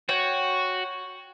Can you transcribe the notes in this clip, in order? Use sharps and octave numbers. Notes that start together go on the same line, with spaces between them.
F#4 C#5 G5